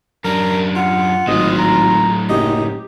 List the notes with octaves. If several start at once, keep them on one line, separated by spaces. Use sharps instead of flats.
F#2 D4 A#4
F4 F#5
G#1 A2 F#3 D#5
A#5
F#1 D#4 G4